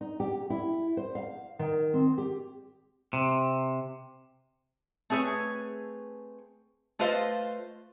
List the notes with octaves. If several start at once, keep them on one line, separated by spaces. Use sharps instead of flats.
D#4
G4
E4
C5
F5
D#3
C4
G4
C3
A3 C4 G#4 B4 C#5
A3 F4 B4 C5 D#5 F5